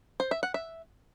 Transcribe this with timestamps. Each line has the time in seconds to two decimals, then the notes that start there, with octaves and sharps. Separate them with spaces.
0.20 C5
0.31 E5
0.43 F#5
0.54 E5